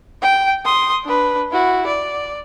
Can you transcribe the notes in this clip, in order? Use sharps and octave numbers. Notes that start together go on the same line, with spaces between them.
G5
C6 D#6
D4 B4
E4 F#4
D5